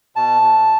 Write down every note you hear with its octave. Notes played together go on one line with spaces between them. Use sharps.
B2 A5
B2